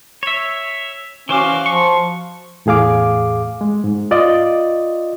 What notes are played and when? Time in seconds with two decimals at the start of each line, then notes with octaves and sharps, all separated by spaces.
0.23 C#5 E5
1.29 E3 C#4 F#4 C5 F5 D6
1.66 F3 C#6
2.66 E2 A2 G#4 F5 D6
3.61 G#3
3.84 G#2
4.11 F4 D5 D#5